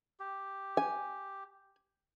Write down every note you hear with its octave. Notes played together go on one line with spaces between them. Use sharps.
G4
G#5